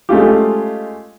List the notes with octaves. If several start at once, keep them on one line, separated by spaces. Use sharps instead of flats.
G#3 A3 C#4 F4 G4